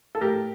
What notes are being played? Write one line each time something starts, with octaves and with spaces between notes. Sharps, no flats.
A4
A2 G4 A#4